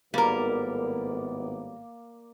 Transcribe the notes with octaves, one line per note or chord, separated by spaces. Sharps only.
G#1 A2 G3 A#3 B3 A#4 D5